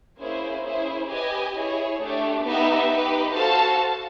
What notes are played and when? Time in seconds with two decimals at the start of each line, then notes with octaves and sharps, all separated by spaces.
0.19 A#3 C#4 E4 G#4 C5
0.63 C#4 E4 G#4 C5
1.09 G4 B4 D#5 G#5
1.54 E4 G#4 C#5
2.00 A3 D4 G4
2.45 B3 D#4 G4 B4 E5
2.90 D#4 G4 B4
3.35 F#4 A4 C5 F5 A5